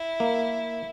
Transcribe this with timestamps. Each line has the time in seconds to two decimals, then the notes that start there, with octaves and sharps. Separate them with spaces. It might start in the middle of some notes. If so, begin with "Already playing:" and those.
Already playing: E4
0.20 A#3